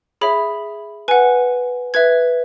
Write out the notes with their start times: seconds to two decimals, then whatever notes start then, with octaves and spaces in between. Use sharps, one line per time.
0.21 G#4 C#5 E5 B5
1.08 B4 F#5 G#5
1.94 B4 E5 G#6